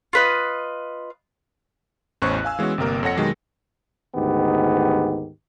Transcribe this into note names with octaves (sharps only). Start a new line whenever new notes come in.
F4 B4 D#5
A1 E2 C#4 C5 C#6 F#6
F5 G#5 E6
E3 G#3 B3 C#4 F#4
G1 C3 A#3 A#4
F2 A4 C#5 F#5 A#6 C#7
B2 D#3 F#3 G#3 G4
D2 G#2 D#3 B3 G4